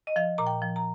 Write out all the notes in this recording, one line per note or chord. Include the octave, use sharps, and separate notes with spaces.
D#5
F3 F5
A#2 A#5
G5
F3
A#5